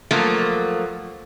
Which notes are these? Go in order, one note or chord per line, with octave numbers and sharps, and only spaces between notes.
F3 F#3 A3 A#3